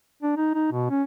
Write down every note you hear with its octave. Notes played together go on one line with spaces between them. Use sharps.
D4
D#4
D#4
B2
C#4